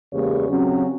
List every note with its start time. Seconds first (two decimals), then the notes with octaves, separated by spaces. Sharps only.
0.13 E2 C#3 G#3 A#3 G4 C#5
0.49 C#3 F#3 C4 C#4